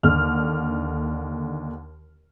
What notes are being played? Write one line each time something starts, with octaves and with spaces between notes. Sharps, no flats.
D#2 D3 F6